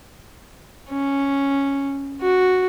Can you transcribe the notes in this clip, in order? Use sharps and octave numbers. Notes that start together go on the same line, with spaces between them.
C#4
F#4